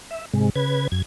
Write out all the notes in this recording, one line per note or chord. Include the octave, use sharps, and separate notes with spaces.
E5
G#2 C3 G#3
C#3 B4 G#6
F#2 G#6